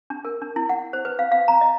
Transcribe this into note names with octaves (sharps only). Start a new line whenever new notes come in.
D4
A#4
D4
E4
F#5
C5
B4
F5
F5
A#5
D#5